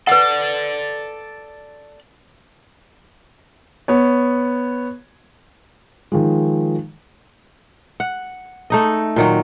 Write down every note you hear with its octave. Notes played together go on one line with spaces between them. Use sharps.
A4 B4 D5 F#5
B3 C#5
D#3 F3 G#3
F#5
A3 D#4 D#5
A#2 D#3 F#3